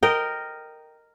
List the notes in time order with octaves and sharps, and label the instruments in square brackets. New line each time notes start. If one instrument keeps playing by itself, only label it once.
[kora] A#4 D#5 G5